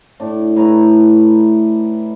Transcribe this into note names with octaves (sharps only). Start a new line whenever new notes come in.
A2 D4
A2 E4 B4 A#5